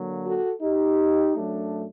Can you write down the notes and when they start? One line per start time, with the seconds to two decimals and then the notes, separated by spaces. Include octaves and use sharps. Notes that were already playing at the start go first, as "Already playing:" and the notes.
Already playing: D3 F#3 A#3
0.26 F#4 A4
0.62 D#4 G4
1.35 F#2 F#3 A3 D4